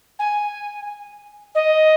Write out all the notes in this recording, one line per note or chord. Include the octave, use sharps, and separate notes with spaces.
G#5
D#5